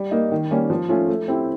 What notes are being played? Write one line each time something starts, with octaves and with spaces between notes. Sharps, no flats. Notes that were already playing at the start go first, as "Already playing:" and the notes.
Already playing: G3
A#3 D#4
D#3
G3 A#3 C#4
F3
A3 C#4 F4
A3
C4 E4 G4